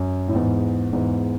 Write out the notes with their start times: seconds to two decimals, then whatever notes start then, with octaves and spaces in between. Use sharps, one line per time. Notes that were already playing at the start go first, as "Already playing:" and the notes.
Already playing: F#2
0.28 A2
0.35 E2 G#2
0.93 E2 G#2